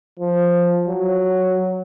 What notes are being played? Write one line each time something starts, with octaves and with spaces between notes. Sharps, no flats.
F3
F#3